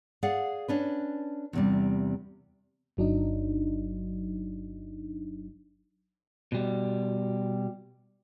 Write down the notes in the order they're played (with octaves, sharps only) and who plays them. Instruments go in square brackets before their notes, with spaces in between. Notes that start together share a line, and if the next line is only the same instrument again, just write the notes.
[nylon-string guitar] G#4 D5 F5 F#5
C#4 D4 B4
E2 C3 G3
[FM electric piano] G1 F#3 D4 D#4
[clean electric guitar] B2 G3